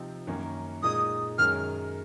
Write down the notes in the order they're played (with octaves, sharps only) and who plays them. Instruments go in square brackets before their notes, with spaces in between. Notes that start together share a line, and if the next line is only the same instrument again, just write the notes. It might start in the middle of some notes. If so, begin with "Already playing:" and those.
Already playing: [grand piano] C3 F3 C4 D#4
F#2 D#3 A#3 C#4
[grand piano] A#2 G#3 D#4 [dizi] D#6
[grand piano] F#2 D#3 G#3 [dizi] F6